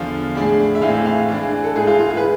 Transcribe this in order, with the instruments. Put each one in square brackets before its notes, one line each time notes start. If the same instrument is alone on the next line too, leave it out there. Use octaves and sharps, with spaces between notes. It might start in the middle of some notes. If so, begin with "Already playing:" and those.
Already playing: [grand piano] E2 D3 F3 [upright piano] F5
[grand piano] A2 G#3 D4 G#4
[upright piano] E5
[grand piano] A2 E3 G#3 C4 [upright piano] F5
[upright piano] F5
[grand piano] E3 G#3 D4
[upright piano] A4
[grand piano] G#2 E3 G#3 [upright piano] G#4
[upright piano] F4
F4
G#4
B4